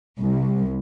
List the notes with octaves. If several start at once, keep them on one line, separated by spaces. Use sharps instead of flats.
C2